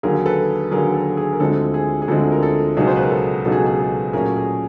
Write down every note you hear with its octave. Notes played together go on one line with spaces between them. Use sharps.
D#2 D3 F#3 G#4 A#4
A4 B4
D#2 D3 F#3 G#4 A#4
A4
G#4
A#4
D2 D3 F3 G#3 C4 A4
G#4
G#4
D2 D3 F3 G#3 C4 A4
A#4
A4
C#2 B2 F#3 B3 D#4 G#4
C5
B4
A#4
A4
C#2 B2 F#3 B3 D#4 A4
G#4
G#4
A4
A#2 F#3 A3 C#4 G#4 A#4
G#4